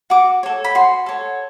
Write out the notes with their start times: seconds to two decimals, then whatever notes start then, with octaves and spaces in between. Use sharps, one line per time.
0.10 F#4 D6
0.43 A4 C#5
0.64 B5
0.75 F#4 C6
1.06 A4 C#5